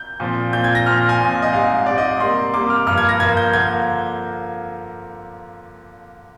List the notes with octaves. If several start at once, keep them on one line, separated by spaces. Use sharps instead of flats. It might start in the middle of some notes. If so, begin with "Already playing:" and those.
Already playing: G6
A#2 F3 C4
A#2 F3 C4 G6
G#6
A#6
A#2 F3 C4 F6
G#5
A#2 F3 C4
D#5
G#2 G3 C4 F5
G#2 G3 C4 D5
D#5
D5
C3 G3 A#3 C6
C3 G3 A#3 D6
F6
G2 F3 A#3 F6
G#6
A#6
G2 F3 A#3 G#6
G6
D3 F3 A#3 G#6